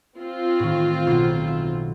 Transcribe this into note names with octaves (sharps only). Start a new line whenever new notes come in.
C4 F4
A2 D#3
B1
E5